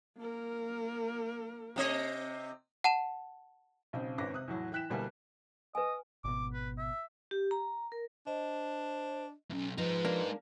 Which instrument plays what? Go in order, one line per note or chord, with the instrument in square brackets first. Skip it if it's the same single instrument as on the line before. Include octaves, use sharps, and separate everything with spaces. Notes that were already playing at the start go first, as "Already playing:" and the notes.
[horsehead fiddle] A#3 A#4
[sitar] C3 C4 D#5
[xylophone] F#5 A5 E7
[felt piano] B1 C#3 C4
G#1 C#4 B4 D6 A#6
C3 D#6 F#6
E2 A2 F#3
E3 G5 F#6 B6 E7
D2 B2 G3 A#3 E4 G#5
[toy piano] B4 G#5 [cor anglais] D#5
[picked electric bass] G#1 B2 [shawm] D6
[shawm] B4
E5
[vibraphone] G4
A#5
A#4
[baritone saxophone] D4 [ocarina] C5 [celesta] D#5
[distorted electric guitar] B1 E2 [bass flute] C#4
[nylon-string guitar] F3 [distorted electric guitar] G#3 D#4 [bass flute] B4
[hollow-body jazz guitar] A#3 D4